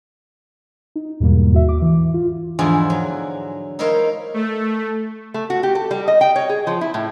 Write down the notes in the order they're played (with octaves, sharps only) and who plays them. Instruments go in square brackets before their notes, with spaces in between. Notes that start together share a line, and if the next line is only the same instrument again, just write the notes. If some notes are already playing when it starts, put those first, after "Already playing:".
[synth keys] D#4
E2 G#2 B2 G3 G#3 A#3
D#2 F#4 E5
D6
E3
F4
[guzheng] E2 G#2 D3 F3 E4 G#4
F#3
D#4 E4 A#4 C5 C#5 F5
[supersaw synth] A3
[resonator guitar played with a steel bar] A3
F#4
G4
A4
G3
D#5
G5
C#5
G#4
F3
E4
A2